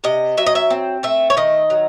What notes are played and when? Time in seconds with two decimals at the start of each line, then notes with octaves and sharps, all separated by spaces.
0.04 C3 D#5
0.37 F#3 E5
0.46 D#5
0.55 E5
0.70 C4
1.03 A3 E5
1.30 C#5
1.37 D#3 D#5
1.70 F#3